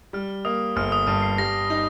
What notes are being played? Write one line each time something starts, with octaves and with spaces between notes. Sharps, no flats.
G3 F6
A#3 D#6
G1 F6
D#6
G2 F6
C7
G3 A#6
D#4